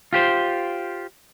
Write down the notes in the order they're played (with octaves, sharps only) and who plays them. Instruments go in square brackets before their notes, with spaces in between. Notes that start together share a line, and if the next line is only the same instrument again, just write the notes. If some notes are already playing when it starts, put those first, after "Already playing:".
[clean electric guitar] F4 G4 C5